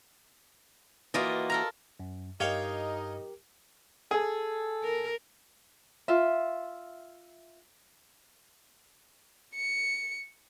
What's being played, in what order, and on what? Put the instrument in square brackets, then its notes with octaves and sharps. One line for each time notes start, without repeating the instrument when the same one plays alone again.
[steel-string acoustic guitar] E3 A#3 F#4 [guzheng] F4 D5 D#5
[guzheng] A4 A#4 A#5
[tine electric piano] F#2
[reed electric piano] G2 [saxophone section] D#4 D#5 [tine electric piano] G4 A#4 [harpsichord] C#5 F5 G5
[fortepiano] G#4 [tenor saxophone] A4
[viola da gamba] A#4
[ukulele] F4 E5
[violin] C#7